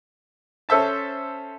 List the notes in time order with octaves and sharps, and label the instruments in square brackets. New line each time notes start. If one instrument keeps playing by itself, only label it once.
[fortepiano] C#4 A4 C5 E5 A5